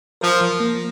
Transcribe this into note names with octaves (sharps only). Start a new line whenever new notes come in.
F3 A#4
F3
A#3